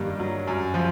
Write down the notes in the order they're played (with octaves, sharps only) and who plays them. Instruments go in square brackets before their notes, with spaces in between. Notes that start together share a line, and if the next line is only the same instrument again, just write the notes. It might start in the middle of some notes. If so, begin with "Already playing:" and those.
Already playing: [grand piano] G2 D#3 A#3
F#3
F#2
F3